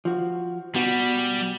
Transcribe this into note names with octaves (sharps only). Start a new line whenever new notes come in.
F3 F#4
B2 G3 F#4